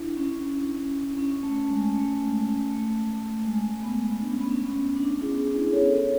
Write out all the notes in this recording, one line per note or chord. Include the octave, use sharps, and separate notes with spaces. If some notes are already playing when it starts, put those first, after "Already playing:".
Already playing: D4 E4
C#4
C#4
A3
G#3
A3
A3
G#3
B3
D4
C#4
B3
C#4
D4
E4 G#4
E4 G#4
A4 C#5